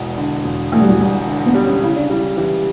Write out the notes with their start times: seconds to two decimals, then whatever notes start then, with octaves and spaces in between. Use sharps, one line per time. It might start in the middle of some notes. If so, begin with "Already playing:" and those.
Already playing: E1 E2
0.18 D3
0.45 E1
0.72 E2 A3
0.80 G3
0.89 F#3
0.97 E1 G3
1.27 D3
1.46 B3
1.55 G3
1.64 C#4
1.82 C#3 E4
1.96 D4
2.10 G3 E4
2.37 E3 G4